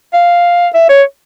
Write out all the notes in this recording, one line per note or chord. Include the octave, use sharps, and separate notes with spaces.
F5
E5
C#5